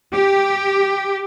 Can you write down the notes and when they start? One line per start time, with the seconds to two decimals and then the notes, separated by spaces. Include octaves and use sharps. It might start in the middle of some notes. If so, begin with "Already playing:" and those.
0.14 G4